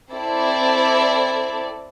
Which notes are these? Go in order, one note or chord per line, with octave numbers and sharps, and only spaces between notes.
C4 E4 A4 D5